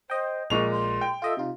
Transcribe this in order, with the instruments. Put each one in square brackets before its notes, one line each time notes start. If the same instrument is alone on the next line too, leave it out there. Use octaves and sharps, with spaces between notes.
[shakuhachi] C5 [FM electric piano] D#5 G5
[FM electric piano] A#1 [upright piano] A#2 G#3 F7 [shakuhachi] C#6
[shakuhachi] C6
[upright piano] G5
[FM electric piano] F4 D#5 E5 [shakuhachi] A4
[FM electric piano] C3 F4 [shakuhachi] D#4